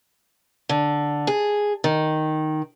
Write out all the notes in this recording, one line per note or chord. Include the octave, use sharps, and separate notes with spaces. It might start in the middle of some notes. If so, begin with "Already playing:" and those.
D3
G#4
D#3